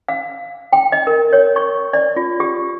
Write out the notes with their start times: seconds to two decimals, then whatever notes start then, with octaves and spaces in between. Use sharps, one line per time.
0.08 F5
0.73 G5
0.92 D#5
1.07 A#4
1.33 C#5
1.56 C#6
1.93 D5
2.16 F4
2.40 G4